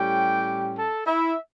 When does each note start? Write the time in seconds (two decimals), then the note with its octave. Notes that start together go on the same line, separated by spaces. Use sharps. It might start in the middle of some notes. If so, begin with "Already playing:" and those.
Already playing: A2 G3 C#4 G4 G5
0.77 A4 A5
1.06 E4 E5